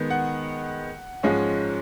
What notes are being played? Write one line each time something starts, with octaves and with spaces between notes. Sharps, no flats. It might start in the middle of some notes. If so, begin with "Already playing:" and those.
Already playing: D#3 G#3 B3
F#5
G#2 F3 G#3 C#4